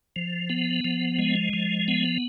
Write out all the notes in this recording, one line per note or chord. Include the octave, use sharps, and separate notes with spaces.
F3
B3
F3
G#3
F3
B3